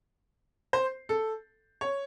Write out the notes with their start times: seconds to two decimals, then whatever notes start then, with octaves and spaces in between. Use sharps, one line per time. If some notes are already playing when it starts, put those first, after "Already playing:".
0.73 C5
1.09 A4
1.81 C#5